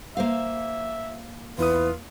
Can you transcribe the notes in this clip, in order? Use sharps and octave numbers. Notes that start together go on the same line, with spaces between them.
A#3 C5 E5 F5
E2 E4 F4 B4 D#6